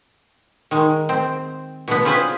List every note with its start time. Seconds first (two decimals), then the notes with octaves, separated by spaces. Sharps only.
0.71 D#3 G#3
1.09 C4
1.88 B2 D3 B3
2.05 C4 C#4 F4 G#4 B4 C5